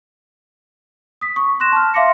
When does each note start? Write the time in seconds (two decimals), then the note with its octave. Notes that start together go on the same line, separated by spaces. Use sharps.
1.21 D#6 B6
1.36 C#6
1.60 C6 F#6 A#6 E7
1.72 A5 F6
1.94 E5 F5 C6 D6 A#6 C#7